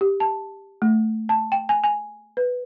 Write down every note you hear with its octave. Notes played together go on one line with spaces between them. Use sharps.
G4
A5
A3
A5
G5
G#5
G#5
B4